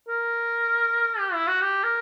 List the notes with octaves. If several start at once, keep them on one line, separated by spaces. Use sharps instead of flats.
A#4
G4
E4
F#4
G4
A#4